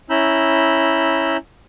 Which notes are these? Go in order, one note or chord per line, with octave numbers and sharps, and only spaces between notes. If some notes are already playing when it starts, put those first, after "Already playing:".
C#4 E4 A#5 B5 E6 G6